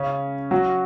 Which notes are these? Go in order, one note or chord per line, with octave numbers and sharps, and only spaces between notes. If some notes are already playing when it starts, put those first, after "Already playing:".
Already playing: C#3 C#4
F#3 F#4